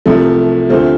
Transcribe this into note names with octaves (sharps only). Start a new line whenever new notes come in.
C2 C3 F3 A3
D2 C3 A3 F4 C5